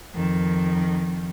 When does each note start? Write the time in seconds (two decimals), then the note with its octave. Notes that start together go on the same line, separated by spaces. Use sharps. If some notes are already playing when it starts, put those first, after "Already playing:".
0.14 F2 D#3